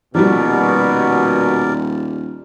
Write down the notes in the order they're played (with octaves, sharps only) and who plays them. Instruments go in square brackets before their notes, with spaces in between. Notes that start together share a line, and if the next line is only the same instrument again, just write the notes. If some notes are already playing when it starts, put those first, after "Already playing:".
[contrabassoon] D#1 [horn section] B2 [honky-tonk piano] F3 G3 [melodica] A#4 D5